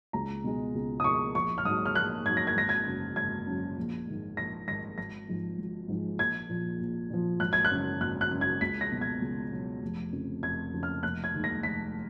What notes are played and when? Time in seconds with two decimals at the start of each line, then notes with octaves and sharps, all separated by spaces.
0.13 C#2 A#5
0.44 B2 G#3
0.75 C#2
1.00 D#6
1.04 B2 G#3 C#6
1.35 A#1 C#6
1.58 F6
1.65 G#2 F#3 D#6
1.86 F6
1.95 A#1 F#6
2.26 G#2 F#3 G#6
2.37 A#6
2.47 G#6
2.56 G#1 A#6
2.69 G#6
2.86 F#2 C#3 F#3
3.16 G#1 G#6
3.47 F#2 C#3 F#3
3.78 A#1
4.07 G#2 D#3 G#3
4.37 A#1 A#6
4.68 G#2 D#3 G#3 A#6
4.98 G#1 A#6
5.28 G#2 F3 G#3
5.59 G#1
5.88 G#2 F3 G#3
6.19 A#1 G#6
6.50 A#2 F3
6.80 A#1
7.10 A#2 F3
7.40 G#1 F#6
7.53 G#6
7.65 F#6
7.70 F#2 C#3
8.01 G#1 F#6
8.21 F#6
8.31 F#2 C#3
8.41 G#6
8.61 C#2 B6
8.81 A#6
8.92 B2 F#3
9.01 G#6
9.22 C#2
9.52 B2 F#3
9.82 F1
10.12 F2 C#3
10.43 F1 G#6
10.73 F2 C#3
10.83 F6
11.03 F1 F#6
11.24 G#6
11.34 D#2 D#3 G#3
11.44 A#6
11.63 F1 B6